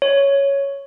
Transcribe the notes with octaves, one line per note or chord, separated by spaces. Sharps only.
C#5